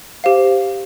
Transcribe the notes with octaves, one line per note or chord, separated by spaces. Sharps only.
G4 C5 F5